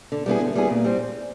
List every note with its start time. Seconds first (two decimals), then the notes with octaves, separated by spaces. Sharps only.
0.12 D3
0.26 G3 B3 E4 G#4
0.41 D3
0.55 G3 B3 E4 G#4
0.70 A#2
0.84 G3 C4